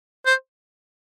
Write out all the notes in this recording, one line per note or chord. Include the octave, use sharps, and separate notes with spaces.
C5